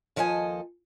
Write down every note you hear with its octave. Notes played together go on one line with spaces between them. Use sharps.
D#2 F3 A4 D#5 E5 G#5